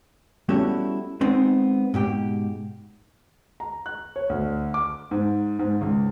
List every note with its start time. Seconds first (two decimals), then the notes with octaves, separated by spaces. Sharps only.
0.49 G3 B3 C#4 E4 F#4 A4
1.21 G#3 B3 C4 D#4
1.94 G#2 B2 G4
3.60 A#5
3.86 F#6
4.16 C#5
4.30 D2
4.74 D6
5.11 G#2
5.59 G#2
5.81 C#2